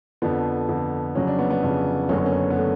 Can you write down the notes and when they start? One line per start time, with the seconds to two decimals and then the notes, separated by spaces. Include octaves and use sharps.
0.22 F2 D3 F3 B3
0.69 F2 D3 F3
1.15 F2 C#3 F#3 C#4
1.27 D4
1.39 B3
1.51 B3
1.62 F2 C#3 F#3
2.09 F#1 F#2 D3 F#3 C#4
2.18 B3
2.26 C#4
2.50 B3
2.56 D3 A3